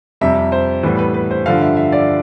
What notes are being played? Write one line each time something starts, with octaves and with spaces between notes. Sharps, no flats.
F2 C3 G3 E5
C5
A2 E3 G3 B3 B4
B4
B4
C5
G2 D3 F3 F5
E5
E5
D5